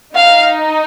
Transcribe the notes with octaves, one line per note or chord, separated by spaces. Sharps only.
D#4 F5